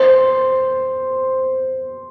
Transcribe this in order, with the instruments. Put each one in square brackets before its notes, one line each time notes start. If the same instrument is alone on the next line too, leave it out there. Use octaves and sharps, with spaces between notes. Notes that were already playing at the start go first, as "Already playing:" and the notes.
Already playing: [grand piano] C5